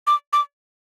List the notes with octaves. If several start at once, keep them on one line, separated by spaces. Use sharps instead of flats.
D6
D6